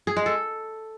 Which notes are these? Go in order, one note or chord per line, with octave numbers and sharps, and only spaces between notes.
G#4
G#3
A4